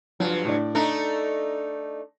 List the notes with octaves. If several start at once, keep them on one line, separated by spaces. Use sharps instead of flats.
G2 F3 F#3
A2 D4
A3 D4 D#4 A#5